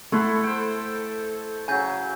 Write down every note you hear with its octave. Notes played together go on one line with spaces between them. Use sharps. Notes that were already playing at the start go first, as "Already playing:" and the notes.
A3 E4 A4 F#5 C6
C5 G5
C#3 F#3 G#5 G6